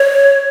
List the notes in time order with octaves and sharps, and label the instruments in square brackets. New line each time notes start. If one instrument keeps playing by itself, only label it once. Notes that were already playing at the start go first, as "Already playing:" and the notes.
Already playing: [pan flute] C#5